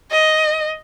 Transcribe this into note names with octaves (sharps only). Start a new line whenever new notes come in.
D#5